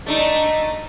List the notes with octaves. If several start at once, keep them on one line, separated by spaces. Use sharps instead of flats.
A3 D4 D#4